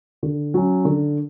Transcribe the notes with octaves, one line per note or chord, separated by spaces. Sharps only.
D3
F#3 C#4
D3